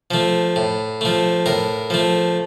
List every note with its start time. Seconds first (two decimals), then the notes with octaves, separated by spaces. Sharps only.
0.11 F3 A3
0.56 A2
1.01 F3 A3
1.46 A2 A#4
1.90 F3 A3